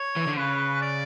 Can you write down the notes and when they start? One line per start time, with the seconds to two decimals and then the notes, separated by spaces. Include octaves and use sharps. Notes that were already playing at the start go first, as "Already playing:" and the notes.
Already playing: C#5
0.16 E3
0.27 D3
0.37 C#3 B4
0.81 D5